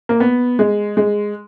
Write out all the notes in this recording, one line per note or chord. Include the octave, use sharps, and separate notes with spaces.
A#3
B3
G#3
G#3